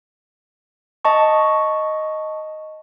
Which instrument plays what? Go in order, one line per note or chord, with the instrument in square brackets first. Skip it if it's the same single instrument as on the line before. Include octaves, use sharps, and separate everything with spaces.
[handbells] D#5 A5 C#6